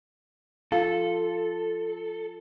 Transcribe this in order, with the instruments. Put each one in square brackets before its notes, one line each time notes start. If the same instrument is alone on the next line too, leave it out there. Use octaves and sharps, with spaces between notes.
[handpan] F4 [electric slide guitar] A4 [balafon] F5